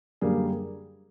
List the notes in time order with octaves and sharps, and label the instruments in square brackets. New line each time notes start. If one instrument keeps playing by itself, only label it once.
[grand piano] F#2 D3 G3 A#3 G#4